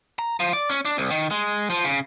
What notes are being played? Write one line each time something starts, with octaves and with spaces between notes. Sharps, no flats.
A#5
F3
D5
C#4
D4
C2
D#3
G#3
F3
C#3